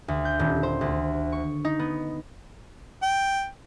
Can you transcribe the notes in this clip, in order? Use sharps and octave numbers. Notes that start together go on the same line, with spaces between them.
D2
G6
D#1
C5
D2
C#6
D#4
B3
G5